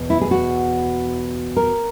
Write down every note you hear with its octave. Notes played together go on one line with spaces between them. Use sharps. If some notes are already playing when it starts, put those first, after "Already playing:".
Already playing: E2 B2
E4
G#4
F#4
A#4